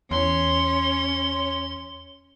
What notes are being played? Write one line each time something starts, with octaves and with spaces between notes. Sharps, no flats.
E2 C#4 C#5 C6